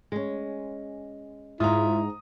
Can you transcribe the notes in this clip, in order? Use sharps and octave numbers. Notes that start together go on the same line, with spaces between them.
G#3 C#4
G#2 E4 F4 A#5 D#6